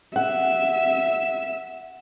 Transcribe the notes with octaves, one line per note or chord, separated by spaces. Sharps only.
E5 F#5